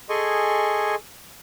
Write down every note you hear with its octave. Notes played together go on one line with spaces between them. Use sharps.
G#4 A4 D#5 G#5 C6 C#6